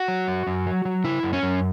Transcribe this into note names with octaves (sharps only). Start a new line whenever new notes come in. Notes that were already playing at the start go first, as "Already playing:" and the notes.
Already playing: F#4
F#3
F#2
F#2
F#3
F#3
C#3 E4
F#2
C#4
F#2